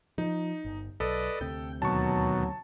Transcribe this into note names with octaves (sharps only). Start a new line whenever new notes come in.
F3 D#4
G1
B1 A4 B4 D5 D#5
D2 C3 G5
D#2 B2 F#3 A5 C#6